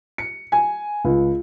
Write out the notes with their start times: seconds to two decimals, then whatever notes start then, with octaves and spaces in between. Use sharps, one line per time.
0.18 C#7
0.52 G#5
1.05 C#2